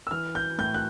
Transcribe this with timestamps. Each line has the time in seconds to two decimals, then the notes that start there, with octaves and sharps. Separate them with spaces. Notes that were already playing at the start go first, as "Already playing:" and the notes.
0.07 E6
0.11 E3 F6
0.35 G6
0.58 A2 G6
0.74 F#6